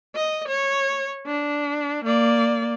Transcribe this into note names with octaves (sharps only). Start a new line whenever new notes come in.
D#5
C#5
D4
A#3 D5